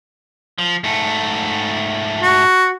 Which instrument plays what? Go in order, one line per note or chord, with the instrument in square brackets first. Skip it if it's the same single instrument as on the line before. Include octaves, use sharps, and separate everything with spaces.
[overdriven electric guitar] F3
G#2 A3
[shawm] F#4